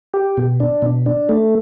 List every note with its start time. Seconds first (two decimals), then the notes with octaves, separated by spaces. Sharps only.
0.14 G4
0.37 B2
0.60 D4
0.82 B2
1.06 D4
1.29 A3